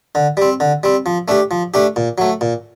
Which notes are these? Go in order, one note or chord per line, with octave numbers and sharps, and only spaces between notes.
D3
G3 C4
D3
G3 C4
F3
A3 D4 G4
F3
A3 D4 G4
A#2
F#3 A3
A#2